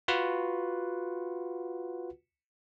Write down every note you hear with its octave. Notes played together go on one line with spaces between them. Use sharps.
F4 F#4 B4 F#5